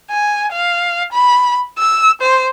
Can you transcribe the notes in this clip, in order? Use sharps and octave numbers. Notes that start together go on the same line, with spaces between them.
G#5
F5
B5
E6
C5